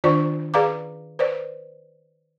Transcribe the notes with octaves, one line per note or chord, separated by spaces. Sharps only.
D#3 D4 F4 C5 D5 C#6
G#4 B4 D5 F5 A#5 D6
B4 C5 D5